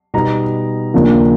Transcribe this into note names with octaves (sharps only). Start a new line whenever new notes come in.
B2 G3 B3 D#4 A#5
D#2 C#3 F3 A#3 D4